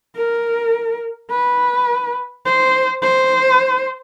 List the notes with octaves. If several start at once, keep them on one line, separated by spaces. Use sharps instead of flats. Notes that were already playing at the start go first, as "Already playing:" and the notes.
A#4
B4
C5
C5